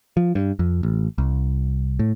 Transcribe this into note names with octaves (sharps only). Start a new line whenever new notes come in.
F3
G2
F2
A1
C2
A2